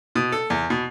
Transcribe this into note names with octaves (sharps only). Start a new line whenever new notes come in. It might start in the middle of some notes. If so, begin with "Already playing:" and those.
B2
A4
E2
B2